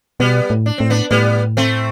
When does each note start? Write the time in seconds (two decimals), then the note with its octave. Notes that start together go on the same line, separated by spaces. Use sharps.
0.20 B2 G3 B3
0.50 A2
0.66 D4
0.78 A2 C4
0.90 B3 D4
1.10 A2 G3 B3
1.57 A3 C4